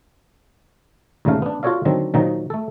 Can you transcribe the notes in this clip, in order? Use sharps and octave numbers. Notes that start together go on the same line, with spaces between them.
D#2 A#2 C#3 A3 F5
B3 D4
F4 F#4 A4 C#5 D5 F5
D3 D#3 F#3 C4
A#2 D#3 F3 F#3 D#4
A3 A4